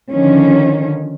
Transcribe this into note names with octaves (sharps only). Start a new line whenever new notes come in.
D3 D#3 F3 C#4